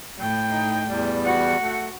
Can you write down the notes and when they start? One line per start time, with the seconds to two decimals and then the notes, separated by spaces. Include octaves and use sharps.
0.18 A2 G5
0.50 D#4
0.87 E2 G3
1.25 F#4 F#5
1.61 A3